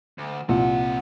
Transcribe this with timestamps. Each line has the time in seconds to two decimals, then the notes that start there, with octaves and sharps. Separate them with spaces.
0.18 D2
0.49 C2 A#2 F3 C4 F#5